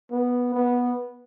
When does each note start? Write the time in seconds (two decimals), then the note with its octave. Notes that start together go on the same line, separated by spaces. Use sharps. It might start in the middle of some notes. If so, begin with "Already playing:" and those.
0.11 B3
0.54 B3